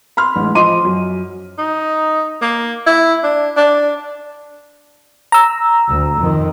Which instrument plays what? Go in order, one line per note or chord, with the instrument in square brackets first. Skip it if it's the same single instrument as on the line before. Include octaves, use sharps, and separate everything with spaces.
[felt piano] B5 C6 F6
A1 G#3
F3 D#5 C6 D6 D#7
F#2
[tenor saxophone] D#4
A#3
E4
D4
D4
[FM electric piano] A#5 E6
[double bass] D2
F2 D#3